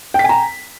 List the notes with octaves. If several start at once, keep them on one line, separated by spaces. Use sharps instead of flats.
G5 G#5 A#5 B6